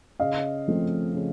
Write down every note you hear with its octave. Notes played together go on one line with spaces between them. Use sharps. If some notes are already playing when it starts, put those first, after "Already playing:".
C#3 D#5 F5
F3 A3 C4
C#3